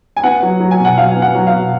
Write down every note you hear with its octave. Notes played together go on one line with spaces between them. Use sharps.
G#5
B3 F#5
F#3
F#3
G#5
B2
F#5
F#3 F5
B3 G#5
F#5
F#3
F5
B2